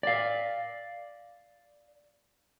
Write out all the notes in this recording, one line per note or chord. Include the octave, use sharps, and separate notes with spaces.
D5 F5